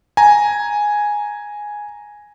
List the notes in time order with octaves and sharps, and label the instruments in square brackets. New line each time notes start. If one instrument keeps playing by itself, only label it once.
[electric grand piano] G#5 A#5